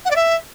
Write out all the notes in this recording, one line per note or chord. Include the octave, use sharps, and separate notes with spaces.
F#5
D5
E5